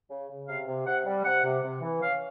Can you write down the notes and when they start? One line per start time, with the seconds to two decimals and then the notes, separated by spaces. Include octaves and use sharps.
0.10 C#3
0.30 C#3
0.48 C3 F5
0.67 C3
0.86 C3 F#5
1.06 G3
1.25 C3 F#5
1.45 C3
1.63 C3
1.82 E3
2.01 C#4 F5